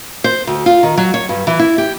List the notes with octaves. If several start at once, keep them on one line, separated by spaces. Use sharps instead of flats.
C5
D2
F4
D#3
F#3
C#5
G2
E3
E4
G4